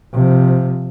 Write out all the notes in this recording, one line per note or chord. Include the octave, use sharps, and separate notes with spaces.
C3 F3